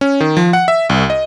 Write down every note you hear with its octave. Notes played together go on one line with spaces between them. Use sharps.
C#4
D#3
F3
F#5
E5
C2
D#5